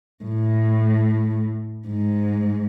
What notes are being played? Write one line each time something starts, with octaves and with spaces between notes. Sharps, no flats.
A2
G#2